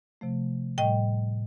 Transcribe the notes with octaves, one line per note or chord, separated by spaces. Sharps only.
C3 F3 A3
A2 G3 D#5 G5